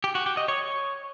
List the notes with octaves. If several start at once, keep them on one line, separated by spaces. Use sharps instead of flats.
G4
F#4
G4
D#5
C#5